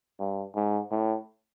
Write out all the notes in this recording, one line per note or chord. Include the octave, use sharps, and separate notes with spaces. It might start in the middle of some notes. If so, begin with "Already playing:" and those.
G2
G#2
A2